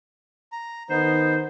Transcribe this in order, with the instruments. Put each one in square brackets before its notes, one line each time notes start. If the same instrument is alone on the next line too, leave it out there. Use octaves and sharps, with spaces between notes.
[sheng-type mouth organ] A#5
[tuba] D#3 [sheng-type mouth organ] B3 D#4 [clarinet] C5